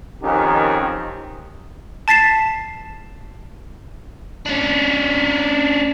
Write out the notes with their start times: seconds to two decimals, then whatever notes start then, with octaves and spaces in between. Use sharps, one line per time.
0.22 F2 D#3 C#4 D#4 G4
2.08 A5 A6 B6 C7 E7
4.46 C#4 D4